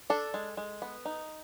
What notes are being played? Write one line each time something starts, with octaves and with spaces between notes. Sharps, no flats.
D4 A4
G#3
G#3
B3
D#4